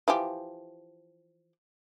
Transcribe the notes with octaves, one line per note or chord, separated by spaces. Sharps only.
E3 F3 G4